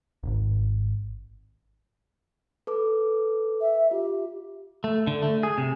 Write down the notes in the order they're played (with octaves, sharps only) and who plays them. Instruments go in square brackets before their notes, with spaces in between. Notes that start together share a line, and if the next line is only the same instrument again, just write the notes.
[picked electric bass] D1 G#1
[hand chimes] A4 B4 D6
[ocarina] E5
[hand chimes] F4 [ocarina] G4
[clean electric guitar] A3
D3
A3
G#4
C3